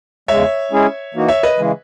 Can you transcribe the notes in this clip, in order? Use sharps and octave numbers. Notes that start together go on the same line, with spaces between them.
E2 C#3 G#3 C#5 E5
G#3 C#4 E4 G#4
E3 A#3 D#4 F#4
C#5 E5
B4 D#5
C#3 E3 G#3